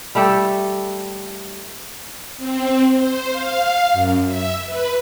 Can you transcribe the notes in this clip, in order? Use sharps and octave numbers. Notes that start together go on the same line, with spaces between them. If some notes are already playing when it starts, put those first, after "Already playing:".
G3 A3 G4 A4
C4
C5
F5
F#2
E5
B4